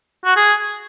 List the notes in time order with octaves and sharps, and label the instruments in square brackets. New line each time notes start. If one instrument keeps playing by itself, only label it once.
[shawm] F#4
G#4